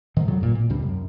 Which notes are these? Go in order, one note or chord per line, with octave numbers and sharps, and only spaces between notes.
G#2 C3 D#3
F2 F#3 G3
G#1 A#2
A#2
C#2 G2 C3 G3
F#2